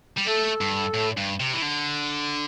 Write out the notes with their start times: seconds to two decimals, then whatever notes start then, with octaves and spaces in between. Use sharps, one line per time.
0.17 G3
0.27 A3 A4
0.61 G2
0.94 A2
1.17 G2
1.40 C3
1.54 E3
1.62 D3